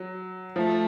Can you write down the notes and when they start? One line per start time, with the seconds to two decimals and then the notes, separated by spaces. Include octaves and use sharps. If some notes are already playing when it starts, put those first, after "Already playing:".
Already playing: F#3
0.56 F3 A3